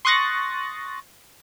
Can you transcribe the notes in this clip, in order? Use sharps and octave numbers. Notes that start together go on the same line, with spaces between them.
C6 C#6 D#6 F#6 A6 A#6